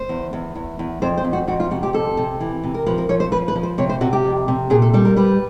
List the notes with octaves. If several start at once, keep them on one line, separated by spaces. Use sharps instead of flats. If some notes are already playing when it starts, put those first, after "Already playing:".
Already playing: C5
E2
E2
E2
E2
F2 C5
C5
F2
F#4
F2 F#4
F4
C3 F#4
G4
F2 A4
C3
E3
C3
A#4
F3 B4
A#4
F3 C#5
C5
F3 B4
B4
F3
C5
C3 C#5
C5
C3 F#4
G4
F2
C3
A#2 G#4
A4
G3 A4
A#4
G3 B4